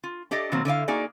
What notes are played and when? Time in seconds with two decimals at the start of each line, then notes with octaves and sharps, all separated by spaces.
0.04 F4
0.31 D4 G4 A4 D5 D#5
0.52 B2 D#3 F#3 A#3 C4
0.65 D3 E4 D5 F5
0.88 A#3 D#4 F#4 G#4 D5